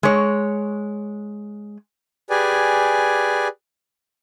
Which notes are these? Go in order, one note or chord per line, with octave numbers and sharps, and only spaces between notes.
G#3 C#5
G4 G#4 B4 D5 G#5